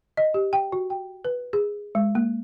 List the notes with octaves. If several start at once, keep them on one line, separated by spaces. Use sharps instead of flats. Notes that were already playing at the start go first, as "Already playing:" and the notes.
D#5
G4
G5
F#4
G5
B4
G#4
G#3
A#3